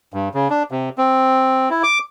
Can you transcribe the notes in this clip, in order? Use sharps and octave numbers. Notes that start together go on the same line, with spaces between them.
G2
C#3
D4
C3
C4
E4
D6